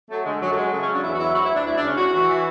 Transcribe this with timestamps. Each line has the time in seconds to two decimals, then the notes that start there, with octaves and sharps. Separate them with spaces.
0.10 F#3 A3
0.25 D3 G#3
0.41 F#2 F#3
0.51 A3
0.56 F#3 G#3
0.72 C#3 A3
0.83 C#4
0.88 F#3
0.93 D4
1.03 E2 E4
1.14 F#4
1.19 F#3 E4
1.35 D2 F#4
1.45 E4
1.51 D2 D4
1.66 D2 E4
1.76 D4
1.81 C#3
1.87 C#4
1.97 A2 F#4
2.13 E3
2.29 E3